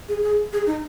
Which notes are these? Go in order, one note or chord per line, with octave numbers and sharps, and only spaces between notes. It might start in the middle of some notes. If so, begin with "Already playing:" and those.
G#4
G#4
G#4
D#4